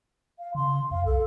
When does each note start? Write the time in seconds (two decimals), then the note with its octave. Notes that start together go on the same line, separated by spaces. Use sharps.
0.39 F5
0.55 C#3 C6
0.91 F2 F5
1.06 C2 A4